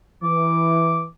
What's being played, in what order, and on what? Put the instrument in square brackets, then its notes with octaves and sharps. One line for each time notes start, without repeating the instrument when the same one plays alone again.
[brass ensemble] E3 [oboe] D6